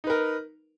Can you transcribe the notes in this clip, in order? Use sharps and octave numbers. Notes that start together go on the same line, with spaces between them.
D#4 A#4 B4